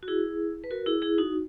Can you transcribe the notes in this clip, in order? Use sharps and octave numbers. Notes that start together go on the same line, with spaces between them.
F#4
E4 G#4
B4
F#4 A#4
E4 G#4
E4 G#4
D#4 F#4